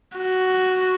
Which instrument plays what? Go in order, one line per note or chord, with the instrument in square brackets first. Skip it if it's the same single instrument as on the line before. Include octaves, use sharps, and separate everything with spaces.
[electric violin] F#4